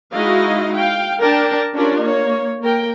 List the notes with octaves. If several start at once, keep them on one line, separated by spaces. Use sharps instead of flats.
G#3 D#4 E4 F#4 D#5 F5
F5 G5
D4 A#4 G5 A5
C#4 D4 F4 G4 A#4 D5
A#3 C#5
A#3 A#4 G5